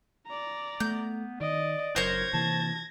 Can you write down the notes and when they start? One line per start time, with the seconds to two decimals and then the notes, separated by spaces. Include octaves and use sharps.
0.27 D5 A#5
0.80 A3 B3 G6
1.40 D#3 D5 D#5
1.96 F#1 F#2 A#4 C5 C#5 G6 G#6 A#6
2.33 C3 E3 A#3 A5